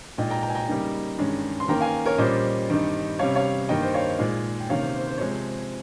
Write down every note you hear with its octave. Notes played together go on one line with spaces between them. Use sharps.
A#2 G#3 D#4 D#5 G5
G5 A#5
G5 A#5
G#5
G5 A#5
C#3 G3 A#3 D#4
G2 D#3 G#3 C#4
C6
D#3 A#3 C#4 G5 A#5
F5 G#5
A#4 C#5
A#2 G3 C#4 C5 D#5
G2 D#3 G3 C4 D#4
C3 G3 C#4 C#5 F5
C#5 F5
G2 D#3 A#3 D#5 G5
C5
C#5 F5
A#2 G#3 D#4
G5
C3 D#3 A#3 C#4 C#5 F5
C5
C5
C5
C3 F3 G#3 C#5
C5